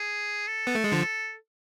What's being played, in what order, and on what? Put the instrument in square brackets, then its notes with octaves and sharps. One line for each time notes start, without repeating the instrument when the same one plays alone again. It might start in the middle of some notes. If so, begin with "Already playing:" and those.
Already playing: [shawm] G#4
A4
[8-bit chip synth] B3
A3
G#3
D3 F3